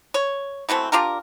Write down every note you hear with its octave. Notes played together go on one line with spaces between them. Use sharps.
C#5
B2 E3 A3 C4
D4 F4 G4 A#4